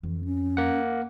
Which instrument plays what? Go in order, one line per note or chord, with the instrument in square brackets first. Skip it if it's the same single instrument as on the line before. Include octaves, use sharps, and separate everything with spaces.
[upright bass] F2 [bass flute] E3
[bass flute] C#4
[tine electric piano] A#3 F#5